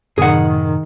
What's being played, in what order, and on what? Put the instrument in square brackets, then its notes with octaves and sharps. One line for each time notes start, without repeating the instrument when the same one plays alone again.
[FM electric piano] F#2 A2 C3 [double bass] D#3 [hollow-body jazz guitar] G#4 F#5